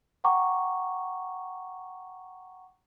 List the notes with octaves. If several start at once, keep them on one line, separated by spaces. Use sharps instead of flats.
F#5 G5 A#5 C#6 D6